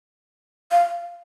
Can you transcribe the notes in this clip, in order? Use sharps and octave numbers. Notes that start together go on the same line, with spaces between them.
F5